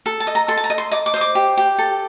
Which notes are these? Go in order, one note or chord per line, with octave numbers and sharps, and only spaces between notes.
A4
A5
D#5
A#5
A4 C6
A5
A#5
D#5
C6
D#5 D6
D6
C5 D#6
D6
G4
G4
A4